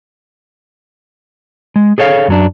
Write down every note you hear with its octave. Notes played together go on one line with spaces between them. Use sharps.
G#3
G#4 A4 C#5 E5 F5
F#2 F#3 D4